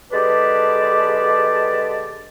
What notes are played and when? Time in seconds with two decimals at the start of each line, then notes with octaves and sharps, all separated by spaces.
0.12 D3 G#3 G4 B4 D5 A5